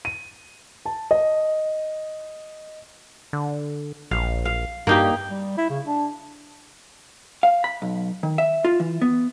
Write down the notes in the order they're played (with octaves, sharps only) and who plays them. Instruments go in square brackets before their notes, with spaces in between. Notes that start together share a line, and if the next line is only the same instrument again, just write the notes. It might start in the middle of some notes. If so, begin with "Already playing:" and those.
[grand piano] D#7
A5
D#5
[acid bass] D3
[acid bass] A#1 [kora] F5
[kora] F5
[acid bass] G2 [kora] A#3 D#4 G4
[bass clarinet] G3
E4
C#3
D4
[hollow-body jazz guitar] F5
B5
B1
D#3
E5
F4
E3
B3